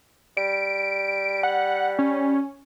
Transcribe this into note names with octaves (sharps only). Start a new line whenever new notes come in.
G3 D7
F#5
C#4